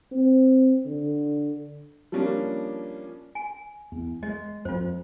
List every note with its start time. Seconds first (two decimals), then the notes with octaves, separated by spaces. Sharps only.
0.12 C4
0.85 D3
2.12 F3 G3 A#3 C#4 D4
3.35 G#5
3.92 E2
4.23 G#3 D#5
4.65 F2 F4 C5